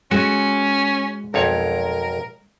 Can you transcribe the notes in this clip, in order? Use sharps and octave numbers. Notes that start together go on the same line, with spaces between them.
G#3 C#4 F#4
B1 F2 A#4 C#5